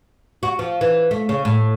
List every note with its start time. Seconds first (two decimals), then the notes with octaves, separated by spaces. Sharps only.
0.43 F#4
0.59 F3
0.81 E3
1.11 A3
1.29 C#3
1.45 A2